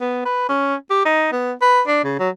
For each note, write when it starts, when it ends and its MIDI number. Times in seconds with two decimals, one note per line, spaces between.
0.01 0.22 59
0.25 0.47 71
0.49 0.75 61
0.90 1.02 67
1.06 1.27 63
1.32 1.53 59
1.62 1.82 71
1.87 2.04 62
2.04 2.19 49
2.19 2.29 54